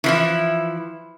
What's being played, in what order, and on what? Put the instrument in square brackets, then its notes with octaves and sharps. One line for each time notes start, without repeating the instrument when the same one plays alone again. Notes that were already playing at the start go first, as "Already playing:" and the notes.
[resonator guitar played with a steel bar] E3 F3 E4